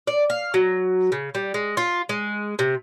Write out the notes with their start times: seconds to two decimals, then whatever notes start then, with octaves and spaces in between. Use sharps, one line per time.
0.07 D5
0.30 F5
0.54 F#3
1.12 C#3
1.35 G3
1.54 G#3
1.77 F4
2.09 G#3
2.59 C3